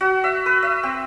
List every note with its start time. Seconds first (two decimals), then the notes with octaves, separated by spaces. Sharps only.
0.01 F#4
0.24 E5
0.46 B4
0.63 E5
0.83 C4